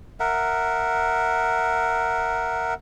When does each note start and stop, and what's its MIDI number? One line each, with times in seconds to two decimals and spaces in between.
0.20 2.74 70
0.20 2.74 76
0.20 2.74 78